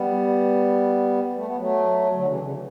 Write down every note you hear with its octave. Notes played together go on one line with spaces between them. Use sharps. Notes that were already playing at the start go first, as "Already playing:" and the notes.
Already playing: G3 B3
A3
B3
F#3 A3
D3 F#3
C#3 E3
C#3
D3